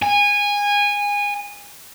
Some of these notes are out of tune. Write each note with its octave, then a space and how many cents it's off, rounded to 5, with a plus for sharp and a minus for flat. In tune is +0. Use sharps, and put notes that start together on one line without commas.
G#5 -20